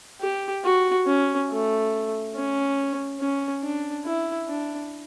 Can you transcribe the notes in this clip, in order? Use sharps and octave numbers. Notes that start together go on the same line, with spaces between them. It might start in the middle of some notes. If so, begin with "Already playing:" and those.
G4
F#4
C#4
A3
C#4
C#4
D4
E4
D4